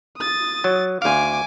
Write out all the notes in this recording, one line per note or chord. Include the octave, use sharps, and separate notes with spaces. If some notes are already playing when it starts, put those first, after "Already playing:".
D#6 A6
F#3
D2 F5 G#5 D6